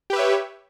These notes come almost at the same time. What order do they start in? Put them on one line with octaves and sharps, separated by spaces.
G4 B4 E5 C#5